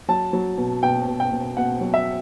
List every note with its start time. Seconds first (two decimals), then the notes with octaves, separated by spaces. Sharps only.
0.08 F#3 A5
0.33 F#3
0.58 B2
0.83 B2 G5
1.07 B2
1.20 G5
1.32 B2
1.57 B2 F#5
1.81 F#3
1.94 E5